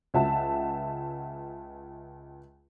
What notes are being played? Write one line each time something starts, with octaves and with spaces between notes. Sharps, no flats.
C#2 E5 F#5 A5